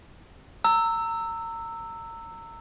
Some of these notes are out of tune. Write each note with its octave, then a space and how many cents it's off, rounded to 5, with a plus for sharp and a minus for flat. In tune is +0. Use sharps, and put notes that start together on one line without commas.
A#5 -30 E6 +0